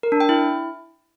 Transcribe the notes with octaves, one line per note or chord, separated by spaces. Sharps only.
A#4
D4
G5
E4